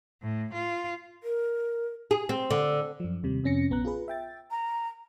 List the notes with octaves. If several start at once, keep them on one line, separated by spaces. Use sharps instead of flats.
A2
F4
A#4
G#4
C4
D3
F#2 F3
D#2 C3 G3
F2 C3 C#4 A#6 C#7
A#1 B3 A#5 F#6
F4 G#4 B4
E5 G5 A6
A#5